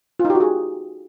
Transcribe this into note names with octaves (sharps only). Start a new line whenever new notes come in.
F4
D#4
G4
F#4
G#4